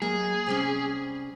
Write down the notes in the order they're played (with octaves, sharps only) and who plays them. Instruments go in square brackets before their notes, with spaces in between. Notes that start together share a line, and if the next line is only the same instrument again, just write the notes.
[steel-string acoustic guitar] F#3 A#3 D#5 [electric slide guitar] G#4
[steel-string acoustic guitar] C3 G3 C#4